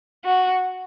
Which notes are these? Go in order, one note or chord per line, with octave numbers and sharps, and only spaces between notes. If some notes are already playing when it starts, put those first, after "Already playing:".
F#4